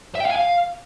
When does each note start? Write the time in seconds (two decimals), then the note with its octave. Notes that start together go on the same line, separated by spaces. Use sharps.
0.15 E5
0.20 G5
0.25 F5
0.30 G#5
0.36 F5